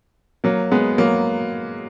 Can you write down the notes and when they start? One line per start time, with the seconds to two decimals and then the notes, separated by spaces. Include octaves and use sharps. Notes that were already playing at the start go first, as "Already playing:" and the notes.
0.44 F#3 A#3
0.71 G#3 B3
0.98 F#3 A#3